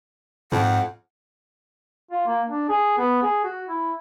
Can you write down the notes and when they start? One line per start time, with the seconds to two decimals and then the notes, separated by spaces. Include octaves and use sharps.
0.52 F2 G#2 F#5
2.11 F4
2.27 A#3
2.48 D4
2.69 G#4
2.98 B3
3.22 G#4
3.44 F#4
3.68 E4